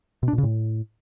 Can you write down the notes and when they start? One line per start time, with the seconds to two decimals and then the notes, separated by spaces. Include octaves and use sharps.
0.23 B2
0.28 D4
0.33 A#2
0.38 C#3
0.43 A2